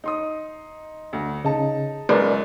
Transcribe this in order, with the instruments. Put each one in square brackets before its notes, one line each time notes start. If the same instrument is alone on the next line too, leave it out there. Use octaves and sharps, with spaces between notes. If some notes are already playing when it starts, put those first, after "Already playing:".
[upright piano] D#4 C6 D#6
D2
[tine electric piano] C#3 [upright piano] D#4 A5
[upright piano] C#2 F#2 [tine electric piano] A#4 B4 D5